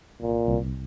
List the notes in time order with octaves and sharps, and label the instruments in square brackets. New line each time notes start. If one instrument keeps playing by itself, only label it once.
[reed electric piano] C2 [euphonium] A#2
[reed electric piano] C2